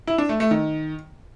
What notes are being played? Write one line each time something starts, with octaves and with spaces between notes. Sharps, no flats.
E4
D4
A3
A3
D#3